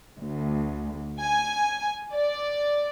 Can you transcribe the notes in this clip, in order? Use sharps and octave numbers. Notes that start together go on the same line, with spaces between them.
D2
G#5
D5